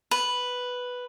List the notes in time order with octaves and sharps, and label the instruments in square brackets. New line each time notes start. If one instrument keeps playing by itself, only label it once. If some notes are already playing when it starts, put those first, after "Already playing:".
[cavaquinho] B4